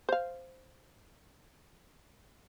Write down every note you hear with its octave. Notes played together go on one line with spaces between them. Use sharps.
C5 F5